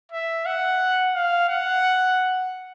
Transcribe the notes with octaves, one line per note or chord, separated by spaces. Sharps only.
E5
F#5
F5
F#5